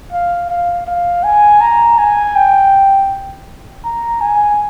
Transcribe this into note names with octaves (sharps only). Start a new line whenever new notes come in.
F5
F5
F5
G#5
A#5
G#5
G5
A#5
G#5